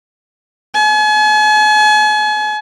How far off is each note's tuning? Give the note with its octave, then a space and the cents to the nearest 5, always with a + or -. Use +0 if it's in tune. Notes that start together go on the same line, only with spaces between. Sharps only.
G#5 +40